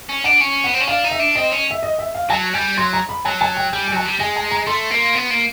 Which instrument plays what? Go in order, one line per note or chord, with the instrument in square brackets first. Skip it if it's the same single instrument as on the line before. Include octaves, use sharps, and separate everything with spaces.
[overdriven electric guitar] C#4
[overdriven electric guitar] D4 [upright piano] F#5
[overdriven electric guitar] C#4
[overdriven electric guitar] B3 [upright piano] F#5
[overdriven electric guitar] C4
C#4
[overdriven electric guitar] D4 [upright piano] F5
[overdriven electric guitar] D#4
[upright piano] E5
[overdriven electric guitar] D4
[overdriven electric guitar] C4 [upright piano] D#5
[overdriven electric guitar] C#4
[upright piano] E5
D#5
E5
F5
[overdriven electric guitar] F#3 [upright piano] A5
[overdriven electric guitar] G3 [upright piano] G#5
[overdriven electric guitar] F#3 [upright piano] C6
[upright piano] A#5
B5
[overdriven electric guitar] F#3 [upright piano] A5
[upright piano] A5
G5
[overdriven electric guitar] G3 [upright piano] G#5
[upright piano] G#5
[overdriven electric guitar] F#3 [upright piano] A5
[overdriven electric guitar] G3
[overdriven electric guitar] G#3 [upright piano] G#5
[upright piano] A5
A#5
[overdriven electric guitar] A3 [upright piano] C6
[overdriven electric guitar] A#3
B3
A#3